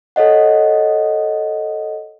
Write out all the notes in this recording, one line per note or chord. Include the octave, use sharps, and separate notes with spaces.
A4 C#5 D#5 F#5